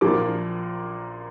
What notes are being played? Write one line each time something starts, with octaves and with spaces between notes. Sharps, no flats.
A#1 A#2 F3 A#3 D6